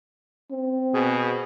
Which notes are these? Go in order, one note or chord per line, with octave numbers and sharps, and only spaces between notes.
C4
B2 G#4